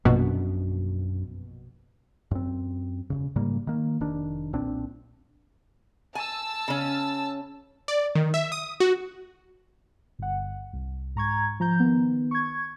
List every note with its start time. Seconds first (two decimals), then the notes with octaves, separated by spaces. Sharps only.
0.05 A#1 F#2 B2 D4
2.31 F#2 C4
3.10 E1 F2 C#3
3.36 G#2 C#3 G3 A#3
3.67 D#3 A#3
4.01 F1 D#3 D4
4.53 B1 A#2 C4 D4
6.15 G#5 A5 E6
6.68 C#3 C#4
7.88 D5
8.15 D#3
8.34 E5
8.52 D#6
8.80 F#4
10.19 G1 F#5
10.73 C2
11.15 G#2 A#5 C#6 G#6
11.60 F3 A#5 G6
11.80 D#3 B3
12.31 C#6 G#6